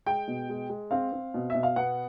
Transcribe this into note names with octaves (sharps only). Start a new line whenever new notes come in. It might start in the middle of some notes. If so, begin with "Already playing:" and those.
G#3 G5
B2
G#3
G#3
C4 F5
C4
B2
B2 E5
F5
B3 F#5